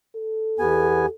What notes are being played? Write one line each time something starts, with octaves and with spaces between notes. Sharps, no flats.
A4
E2 B3 G4 G#5